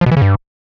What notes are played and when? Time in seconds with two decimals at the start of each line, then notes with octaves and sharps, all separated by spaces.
0.01 F3
0.06 B2
0.11 E3
0.17 C#3
0.22 G2